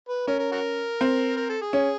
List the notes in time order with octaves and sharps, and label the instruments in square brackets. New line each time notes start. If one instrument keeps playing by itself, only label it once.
[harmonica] B4
[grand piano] C#4 [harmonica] A#4
[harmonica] A#4
F#4 A#4
[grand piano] C4
[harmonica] A#4
A4
G#4
[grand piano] C#4 [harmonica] G#4